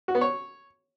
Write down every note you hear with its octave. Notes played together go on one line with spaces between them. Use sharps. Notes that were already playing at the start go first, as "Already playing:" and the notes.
F#4
B3
C#5